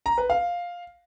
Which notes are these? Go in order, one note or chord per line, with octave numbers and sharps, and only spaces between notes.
A#5
B4
F5